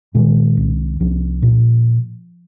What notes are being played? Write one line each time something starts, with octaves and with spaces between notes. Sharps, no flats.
A#2 D#3 G#3
C2
C2 F3
A#2